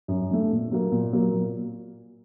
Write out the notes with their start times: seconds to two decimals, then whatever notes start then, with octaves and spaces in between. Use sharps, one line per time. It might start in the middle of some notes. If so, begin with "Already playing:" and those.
0.08 F#2
0.29 D3 A3
0.50 A#2
0.71 F#3 A#3
0.92 A#2
1.13 F#3 A#3
1.34 A#2